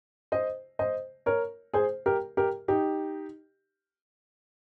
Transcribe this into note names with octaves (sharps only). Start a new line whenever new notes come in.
C5 D#5
C5 D#5
A#4 C#5
G#4 C5
G4 A#4
G4 A#4
D#4 G4